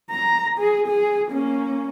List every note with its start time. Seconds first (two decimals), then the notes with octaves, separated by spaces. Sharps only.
0.11 A#5
0.58 G#4
0.87 G#4
1.29 A#3 C#4